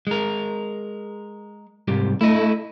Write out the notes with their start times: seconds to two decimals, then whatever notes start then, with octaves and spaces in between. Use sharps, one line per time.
0.07 G#3 A#4
1.88 C2 G#2 G4
2.21 A3 E4 D#5